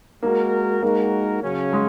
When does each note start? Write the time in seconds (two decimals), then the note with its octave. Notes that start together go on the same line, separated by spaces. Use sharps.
0.23 G#3 A#3 F#4 A#4
0.82 G#3 A#3 D#4 F#4 A#4
1.43 C#3 F#3 C#4
1.73 G#3